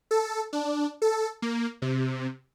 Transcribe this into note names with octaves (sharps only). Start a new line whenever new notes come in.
A4
D4
A4
A#3
C3